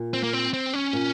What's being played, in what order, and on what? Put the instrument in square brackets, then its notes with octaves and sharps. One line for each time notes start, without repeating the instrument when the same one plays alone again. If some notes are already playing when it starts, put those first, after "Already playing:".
Already playing: [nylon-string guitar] A#2
[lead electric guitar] C4
A#3
C4
C4
C#4
[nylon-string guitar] A#2